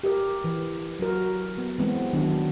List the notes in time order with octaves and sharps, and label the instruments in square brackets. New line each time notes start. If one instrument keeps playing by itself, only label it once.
[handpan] G4 A#4
E3
F#3 F#4 A#4
B3
E3 G#3 B3 C4
D#3 F#3 B3 D4